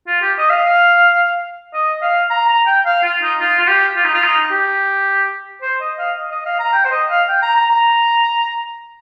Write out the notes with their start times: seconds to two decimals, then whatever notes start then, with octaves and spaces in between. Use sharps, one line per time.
0.07 F4
0.22 G4
0.38 D#5
0.50 F5
1.74 D#5
2.02 F5
2.30 A#5
2.48 A#5
2.66 G5
2.86 F5
3.03 F4
3.23 D#4
3.41 F4
3.59 F4
3.68 G4
3.96 F4
4.05 D#4
4.14 F4
4.23 D#4
4.51 G4
5.62 C5
5.81 D#5
5.99 F5
6.17 D#5
6.31 D#5
6.46 F5
6.60 A#5
6.73 G5
6.85 C5
6.91 D#5
7.10 F5
7.29 G5
7.42 A#5
7.56 A#5
7.70 A#5